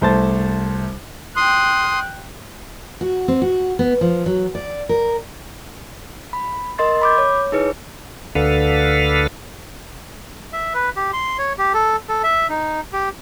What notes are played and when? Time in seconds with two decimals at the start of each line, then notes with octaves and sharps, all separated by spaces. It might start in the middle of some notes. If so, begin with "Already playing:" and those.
0.01 C2 A3 C5 A5 A6
1.36 G5 C6 D#6 F#6
3.01 F#4
3.28 C4
3.42 F#4
3.79 B3
4.01 F3
4.26 F#3
4.55 D5
4.89 A#4
6.33 B5
6.78 A#4 D#5 C6 A6
7.01 B5 D6 G6
7.18 C#5
7.52 D#4 E4 G#4 B4 C#5
8.35 D2 D3 A4 B4 F5
10.53 E5
10.74 B4
10.96 G4
11.13 C6
11.39 C#5
11.58 G4
11.74 A4
12.09 A4
12.24 E5
12.49 D#4
12.93 G4